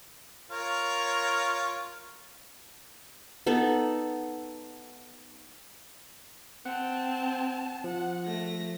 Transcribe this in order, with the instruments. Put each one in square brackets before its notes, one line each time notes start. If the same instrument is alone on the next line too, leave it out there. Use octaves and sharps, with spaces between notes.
[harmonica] F4 A#4 C#5
[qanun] B3 D#4 A4
[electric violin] C4 A5 [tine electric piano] F#5
[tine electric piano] F3 [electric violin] F#5
[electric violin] A3 A#6